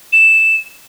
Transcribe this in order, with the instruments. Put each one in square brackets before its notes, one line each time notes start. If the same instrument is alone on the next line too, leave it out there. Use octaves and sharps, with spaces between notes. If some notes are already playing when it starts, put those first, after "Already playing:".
[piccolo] E7